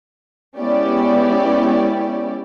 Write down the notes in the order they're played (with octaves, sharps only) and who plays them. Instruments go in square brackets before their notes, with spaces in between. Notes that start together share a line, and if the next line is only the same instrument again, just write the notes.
[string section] G#3 B3 C#4 E4 G4 D5